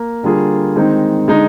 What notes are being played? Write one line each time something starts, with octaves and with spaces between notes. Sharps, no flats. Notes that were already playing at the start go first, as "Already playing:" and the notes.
Already playing: A#3
D3 G3 A#3 F4 G#4
D#3 G#3 C4 D#4
D3 G#3 D#4